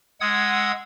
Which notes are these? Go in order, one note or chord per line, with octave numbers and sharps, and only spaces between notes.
G#3 F#5 D#6 E6 G#6